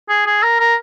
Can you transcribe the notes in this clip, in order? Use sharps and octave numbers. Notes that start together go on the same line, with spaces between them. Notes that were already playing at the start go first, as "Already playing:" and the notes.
G#4
G#4
A#4
A#4